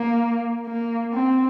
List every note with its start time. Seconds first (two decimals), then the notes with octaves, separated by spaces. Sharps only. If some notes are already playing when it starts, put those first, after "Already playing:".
Already playing: A#3
0.66 A#3
1.13 C4